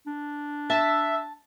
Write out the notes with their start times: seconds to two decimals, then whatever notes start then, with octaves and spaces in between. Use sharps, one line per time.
0.07 D4
0.70 E5 A5